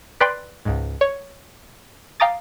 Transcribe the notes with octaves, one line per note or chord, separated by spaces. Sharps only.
B4 D5 G5 C6
C#2 G#2
C#5
F5 G5 A#5 D6 D#6 A6